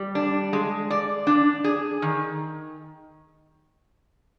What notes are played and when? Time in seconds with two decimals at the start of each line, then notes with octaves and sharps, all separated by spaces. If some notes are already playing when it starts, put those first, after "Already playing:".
Already playing: G3
0.15 D4
0.53 G#3
0.90 D5
1.27 D4
1.64 G#4
2.02 D#3